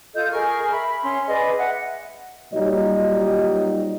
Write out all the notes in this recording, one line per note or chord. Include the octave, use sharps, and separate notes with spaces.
F4 A4 D#5 G6
G#4 A#4 C#6 F6
E5 B5
C#4 C6
G#4 B4 D5 D#5
E5 F#5
A#2 F#3 G3 D#4 D#5